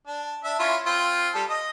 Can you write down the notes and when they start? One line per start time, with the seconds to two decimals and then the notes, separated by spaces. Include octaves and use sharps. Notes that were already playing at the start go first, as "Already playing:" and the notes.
0.07 D4
0.44 D4 E5
0.59 C#4 E4 F4
0.86 C4 F4
1.35 G3 A4
1.49 D#5